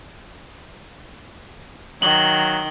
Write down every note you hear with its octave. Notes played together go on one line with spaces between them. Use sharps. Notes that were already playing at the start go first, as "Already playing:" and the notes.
D#3 F#3 F#7 G7